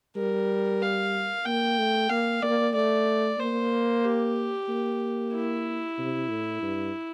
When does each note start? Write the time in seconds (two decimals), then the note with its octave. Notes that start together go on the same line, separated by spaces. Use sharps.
0.16 G3 A#4
0.82 F5
1.46 A#3 G5
1.79 A3
2.10 A#3 F5
2.42 A#3 D5
2.74 A3 D5
3.39 A#3 C5
4.04 G4
4.69 A#3
5.33 E4
5.98 C3
6.29 A2
6.62 G2